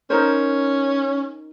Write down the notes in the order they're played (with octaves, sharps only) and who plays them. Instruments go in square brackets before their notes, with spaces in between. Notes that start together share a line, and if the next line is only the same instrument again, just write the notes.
[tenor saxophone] C#4 [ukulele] D#4 A#4 C5